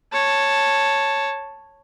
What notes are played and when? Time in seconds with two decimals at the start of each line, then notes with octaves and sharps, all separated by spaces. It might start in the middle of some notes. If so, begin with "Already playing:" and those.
0.13 C#5 A5